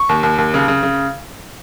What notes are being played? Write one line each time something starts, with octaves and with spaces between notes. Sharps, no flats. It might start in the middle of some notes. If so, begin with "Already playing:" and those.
Already playing: C#6
D#2
D#2
D#2
C#3
C#3
C#3